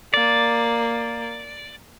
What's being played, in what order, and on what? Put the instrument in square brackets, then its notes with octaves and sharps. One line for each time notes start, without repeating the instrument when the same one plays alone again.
[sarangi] A#3 [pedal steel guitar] D5